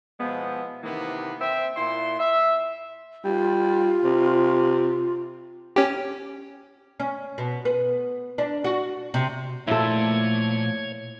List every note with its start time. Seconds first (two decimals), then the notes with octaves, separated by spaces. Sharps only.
0.20 B2 F3 G#3 B3 E4
0.83 C3 D#3 E3 A#3 B3
1.41 C4 E5
1.76 A#2 E4 C6
2.20 E5
3.24 G3 F4
4.04 C3
5.76 C#4 G4
7.00 C#4
7.38 B2
7.65 B3
8.38 D4
8.64 F#4
9.14 C3
9.67 A#2 F3 A3 E4 A4 C#5 G#6